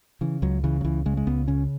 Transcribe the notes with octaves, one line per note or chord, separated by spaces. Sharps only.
C#3 E3
C#2 F#3
C#3 E3
F#3
C#2 E3
C#3 G#3
G#3
C#2 B3
C#3 C#4